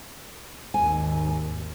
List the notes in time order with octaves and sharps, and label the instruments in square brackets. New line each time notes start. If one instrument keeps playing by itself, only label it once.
[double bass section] G#1 D#2 [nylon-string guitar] G#5